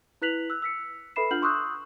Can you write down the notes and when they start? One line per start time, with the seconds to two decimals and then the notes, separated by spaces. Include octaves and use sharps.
0.22 E4 B4 F#6 B6 F7 F#7
0.50 E6 F#6
0.62 E6 B6 C#7
1.16 A4 B4 E5 B5 C7 E7
1.31 D4 F4 F#5 F6 G6 F#7
1.42 C6 C#6 D#6 E6 F#6 G6